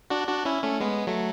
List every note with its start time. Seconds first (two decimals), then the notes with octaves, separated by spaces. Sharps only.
0.10 D4 F#4
0.28 D4 F#4
0.45 C#4 E4
0.63 A3 C#4
0.80 G#3 B3
1.07 F#3 A3